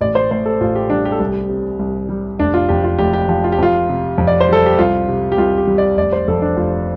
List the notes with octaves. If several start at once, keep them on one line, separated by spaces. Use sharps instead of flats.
A1 D5
C5
A2 C5
A4
A1 F4
G4
G3 D4
G4
A4
C2 G4
C3
C2
G3
F1 D4
F4
F2 G4
F4
F1 G4
G4
F3 G4
F4
G4
F2 F4
C3
F2
D5
C5
G3 A4
G4
C2 F4
C3
G4
C2 F4
G4
G3
D5
F1 D5
C5
F2 A4
D4
F1 F4